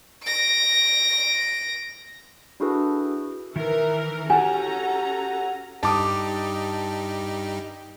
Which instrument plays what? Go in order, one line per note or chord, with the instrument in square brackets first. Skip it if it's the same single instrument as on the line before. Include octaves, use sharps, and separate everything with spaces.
[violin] A#6 D7
[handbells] D4 E4 F#4 G#4 A4 B4
[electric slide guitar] D#3 E4 [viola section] E3 A#4
[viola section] C#4 A4 A#5 [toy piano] E4 G#5 [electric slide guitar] F#4 G4 [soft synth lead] F#5
[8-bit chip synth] G2 D#4 G4 [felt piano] A5 D6 D#6